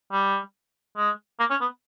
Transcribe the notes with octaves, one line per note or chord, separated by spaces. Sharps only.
G3
G#3
A#3
C#4
B3